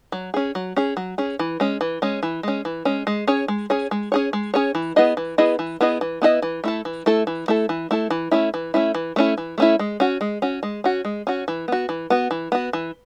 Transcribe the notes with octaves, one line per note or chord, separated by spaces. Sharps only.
F#3
C#4 G#4
F#3
C#4 G#4
F#3
C#4 G#4
E3
G#3 C#4
E3
G#3 C#4
E3
G#3 C#4
E3
G#3 C#4
G#3
C#4 G#4 C#5
G#3
C#4 G#4 C#5
G#3
C#4 G#4 C#5
G#3
C#4 G#4 C#5
E3
B3 E4 G#4 D#5
E3
B3 E4 G#4 D#5
E3
B3 E4 G#4 D#5
E3
B3 E4 G#4 D#5
E3
A3 E4 A4
E3
A3 E4 A4
E3
A3 E4 A4
E3
A3 E4 A4
E3
A3 C#4 E4
E3
A3 C#4 E4
E3
A3 C#4 E4
E3
A3 C#4 E4
G#3
C#4 F#4
G#3
C#4 F#4
G#3
C#4 F#4
G#3
C#4 F#4
E3
B3 F#4
E3
B3 F#4
E3
B3 F#4
E3